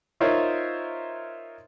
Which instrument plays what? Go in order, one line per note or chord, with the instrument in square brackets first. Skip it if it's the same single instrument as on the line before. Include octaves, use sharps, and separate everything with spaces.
[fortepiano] D#4 F4 A#4 C5 C#5 E5